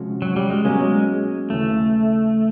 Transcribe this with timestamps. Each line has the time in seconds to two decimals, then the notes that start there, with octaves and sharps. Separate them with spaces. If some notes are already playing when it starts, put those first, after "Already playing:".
Already playing: C3 F3 G#3 C#4 F#4
0.22 F#3
0.36 G3
0.50 G#3
0.65 B2 F#3 G#3 A#3 C#4 F#4
1.50 D#2 C#3 E3 A3